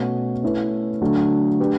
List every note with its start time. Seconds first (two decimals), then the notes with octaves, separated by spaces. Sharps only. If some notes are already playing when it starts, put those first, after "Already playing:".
Already playing: B2 A3 C#4 F#4
0.43 A3 C#4 E4 B4
1.01 D3 F#3 A3 D4
1.60 A3 D4 G4 B4